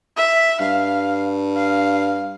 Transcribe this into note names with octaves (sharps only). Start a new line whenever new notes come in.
E5
G2 F5
F5